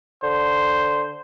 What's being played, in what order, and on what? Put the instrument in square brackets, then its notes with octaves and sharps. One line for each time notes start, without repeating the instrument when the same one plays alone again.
[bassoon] D3 [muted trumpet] C5